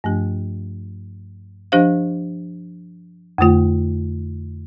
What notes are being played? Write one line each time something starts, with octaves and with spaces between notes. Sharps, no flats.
G2 F3 A3 D4 G4
F3 D4 G4 C5 F5
F2 D3 A3 F4